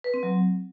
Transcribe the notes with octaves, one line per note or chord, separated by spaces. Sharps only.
B4
C4
F#3